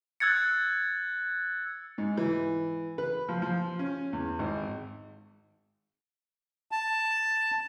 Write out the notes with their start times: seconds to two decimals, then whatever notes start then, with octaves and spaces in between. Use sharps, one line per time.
0.20 E6 F#6 G#6 A6 C#7
1.98 G#2
2.17 E3
2.98 B4
3.29 F3
3.42 F3
3.79 C#4
4.13 E2
4.39 G#1
6.71 A5